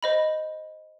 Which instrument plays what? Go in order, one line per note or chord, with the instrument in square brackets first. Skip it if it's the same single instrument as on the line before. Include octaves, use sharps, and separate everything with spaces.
[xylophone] C5 D#5 B5